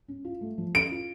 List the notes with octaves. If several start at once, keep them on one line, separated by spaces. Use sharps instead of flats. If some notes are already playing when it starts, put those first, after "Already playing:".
C#4
F4
A3
F3
C#4 D7
F4